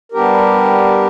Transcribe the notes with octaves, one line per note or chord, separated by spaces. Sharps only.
G3 B3 D4 G4 A#4